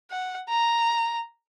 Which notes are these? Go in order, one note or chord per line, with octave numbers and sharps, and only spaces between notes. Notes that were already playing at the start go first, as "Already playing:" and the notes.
F#5
A#5